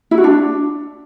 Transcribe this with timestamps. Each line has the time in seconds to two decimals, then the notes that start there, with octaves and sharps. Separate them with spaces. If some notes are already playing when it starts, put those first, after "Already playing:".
0.11 E4
0.18 F#4
0.24 D4